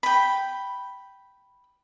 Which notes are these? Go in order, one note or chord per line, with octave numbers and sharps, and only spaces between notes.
G5 B5